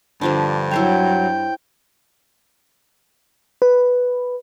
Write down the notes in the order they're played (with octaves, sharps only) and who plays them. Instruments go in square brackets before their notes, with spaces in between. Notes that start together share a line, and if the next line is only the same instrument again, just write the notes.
[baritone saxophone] G2 [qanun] D3 F3 D4
[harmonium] F#3 [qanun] E4 C5 C#5 [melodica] G5
[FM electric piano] B4